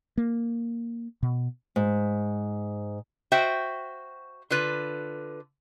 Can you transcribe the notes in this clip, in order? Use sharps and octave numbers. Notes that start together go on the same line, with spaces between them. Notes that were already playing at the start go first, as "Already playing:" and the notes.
A#3
B2
G#2
F#4 C5 E5 G5
D3 F4 B4